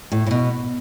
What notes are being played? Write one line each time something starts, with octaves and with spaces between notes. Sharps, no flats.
A2
A2
B2